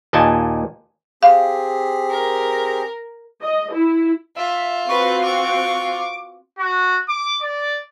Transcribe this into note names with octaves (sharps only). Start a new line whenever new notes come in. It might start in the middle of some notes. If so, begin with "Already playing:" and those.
D#2 A#2 D#5 G#5 A5
C4 G4 G#4 F5
A#4
D#5
E4
F4 E5
C4 F#4 B4 C#6
C#6 D6
F#4
D6
D5